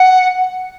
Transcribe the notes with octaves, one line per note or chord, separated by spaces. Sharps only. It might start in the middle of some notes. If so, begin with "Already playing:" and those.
Already playing: F#5